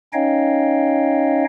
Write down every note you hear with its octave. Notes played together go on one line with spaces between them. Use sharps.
C#4 D#4 C#5 D#5 F5 G5